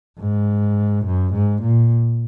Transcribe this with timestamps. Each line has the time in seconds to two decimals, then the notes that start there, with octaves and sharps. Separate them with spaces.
0.20 G#2
1.06 F#2
1.34 G#2
1.62 A#2